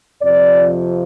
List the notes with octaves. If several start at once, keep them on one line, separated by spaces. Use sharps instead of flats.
F2 C3 F3 D5